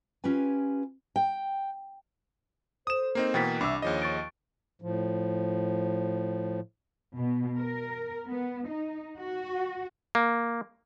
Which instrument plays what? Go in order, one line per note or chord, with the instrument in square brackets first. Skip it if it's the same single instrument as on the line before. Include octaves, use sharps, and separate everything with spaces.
[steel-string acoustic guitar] C#4 F4 G4 B4 G#5
G5
[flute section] A4 C5 [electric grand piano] D#6 E7
[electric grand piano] A#3 C4 D#4
[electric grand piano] B2 E3 A#3 [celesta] G5 A6 B6
[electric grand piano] C2 E6 [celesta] D4 B5 D6 [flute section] E5
[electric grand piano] D#2 F3 D#5 [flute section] G#4 C#5
[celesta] C#6 A6 D7
[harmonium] A2 F3
[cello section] B2
A#4
B3
D#4
F#4
[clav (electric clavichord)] A#3